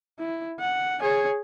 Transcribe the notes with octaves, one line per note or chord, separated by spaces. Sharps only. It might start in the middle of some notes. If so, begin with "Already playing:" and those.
E4
F#5
G#4 C#5